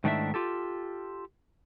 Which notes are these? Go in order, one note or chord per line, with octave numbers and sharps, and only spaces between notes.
G#2 D#3 A3 D4 E4 E5
F4 G4 A4